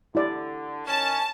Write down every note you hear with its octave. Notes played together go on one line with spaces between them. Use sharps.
D3 E4 G4 D5
D#3 C#4 A5